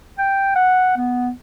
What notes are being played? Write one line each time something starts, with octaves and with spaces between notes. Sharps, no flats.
G5
F#5
B3